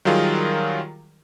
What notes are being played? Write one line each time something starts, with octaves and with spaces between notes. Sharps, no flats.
D#3 F#3 G3 F4 G#4 A#4